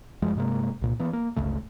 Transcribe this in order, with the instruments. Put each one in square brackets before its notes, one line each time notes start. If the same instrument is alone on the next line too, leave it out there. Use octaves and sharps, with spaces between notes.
[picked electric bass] F#2 F3 G3 G#3
G2 C3 G#3 A#3
C2 A#2
E3 A#3 B3
A#3
G1 C#2 C#3 A3